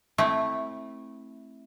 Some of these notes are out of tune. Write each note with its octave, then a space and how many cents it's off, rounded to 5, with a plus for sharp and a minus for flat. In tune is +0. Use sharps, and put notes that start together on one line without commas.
A3 +0 C4 +20 E4 -10